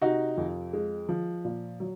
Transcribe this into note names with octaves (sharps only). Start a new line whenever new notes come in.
C3 D#4 F#4
F2
G#3
F3
A#2
F#3